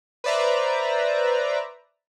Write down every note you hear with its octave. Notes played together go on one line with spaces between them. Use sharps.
B4 C5 D5 E5 A#5